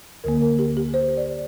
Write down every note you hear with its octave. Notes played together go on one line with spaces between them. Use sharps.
D2 D3 A#3 A#4
A#4
G4
G4
C5
D5